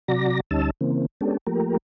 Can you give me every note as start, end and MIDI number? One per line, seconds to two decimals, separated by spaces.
0.08 0.40 48
0.08 0.40 54
0.08 0.40 66
0.08 0.40 74
0.08 0.40 82
0.08 0.40 94
0.51 0.70 38
0.51 0.70 55
0.51 0.70 61
0.51 0.70 63
0.51 0.70 81
0.51 0.70 88
0.81 1.06 49
0.81 1.06 52
0.81 1.06 58
0.81 1.06 60
1.21 1.37 56
1.21 1.37 59
1.21 1.37 61
1.21 1.37 62
1.21 1.37 67
1.21 1.37 69
1.47 1.77 53
1.47 1.77 57
1.47 1.77 58
1.47 1.77 67
1.47 1.77 70